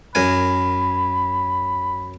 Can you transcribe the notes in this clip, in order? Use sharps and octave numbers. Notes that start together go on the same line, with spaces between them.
F#2 A#4 G#5 B5